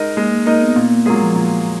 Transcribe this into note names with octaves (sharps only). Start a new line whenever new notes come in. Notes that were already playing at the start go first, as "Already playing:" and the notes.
Already playing: G#3 D#4 A#4 D#5
G#3 A#3
A#3
A#3 D#4 A#4 D#5
B3
A#2 B3
A#3
F#3 G#3 A#3 F4 G#4
F3
A#2